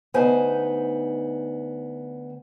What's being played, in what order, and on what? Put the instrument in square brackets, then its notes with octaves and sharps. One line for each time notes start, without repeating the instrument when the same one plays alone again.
[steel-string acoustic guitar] D2 B3 D#4 C5 G#5